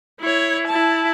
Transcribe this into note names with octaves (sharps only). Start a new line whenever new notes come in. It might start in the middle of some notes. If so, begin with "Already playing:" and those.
E4 C#5
E4 A5